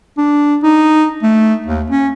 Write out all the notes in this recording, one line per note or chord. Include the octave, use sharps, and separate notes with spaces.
D4
D#4
A3
D#2
C#4